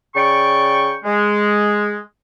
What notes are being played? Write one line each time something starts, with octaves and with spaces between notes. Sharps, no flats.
C#3 D5 G5 C#6
G#3